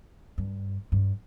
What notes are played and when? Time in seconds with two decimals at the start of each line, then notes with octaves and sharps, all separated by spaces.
0.38 G2
0.92 G2